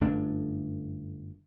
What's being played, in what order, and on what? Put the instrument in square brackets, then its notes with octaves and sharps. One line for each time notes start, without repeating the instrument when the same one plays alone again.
[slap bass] G1 F#2 A3 D4